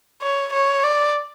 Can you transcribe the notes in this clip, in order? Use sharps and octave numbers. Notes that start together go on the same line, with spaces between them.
C#5
C#5
D5